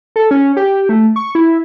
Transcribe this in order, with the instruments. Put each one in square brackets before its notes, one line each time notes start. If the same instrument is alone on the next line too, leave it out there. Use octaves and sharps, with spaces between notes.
[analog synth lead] A4
C#4
G4
A3
C#6
E4